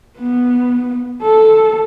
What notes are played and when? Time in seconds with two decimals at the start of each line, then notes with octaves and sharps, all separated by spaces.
0.18 B3
1.22 A4